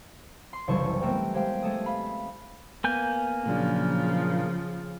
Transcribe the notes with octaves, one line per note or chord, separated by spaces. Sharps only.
C6
F#1 C2 E3 A5 C#6
A3 B3 C4 A#4 G5
G#3 G4 C5 F5 G5
G#3 A3 A4 D#6
F5 B5
A#3 B3 G#5 G6
A#2 C#3 F3 F#3 D4